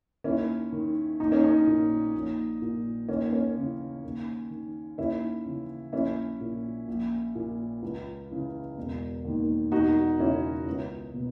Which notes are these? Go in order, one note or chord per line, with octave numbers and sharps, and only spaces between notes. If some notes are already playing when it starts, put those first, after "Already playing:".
D#2 C#4 E4
D#3
A#1 D#4
C#4
D#4
A#2
A#1
A#2
D#2 C#4
C#4
C#3 E3
D#2
D#3
D#2 C#4 E4
C#3 E3
A#1 C#4 E4
A#2
A#1
A#2
C#2
C#3 E3
E1
D#2 D#3
E1 D#4 F#4
E2 C#3 E3 C#4 E4
C#2
B2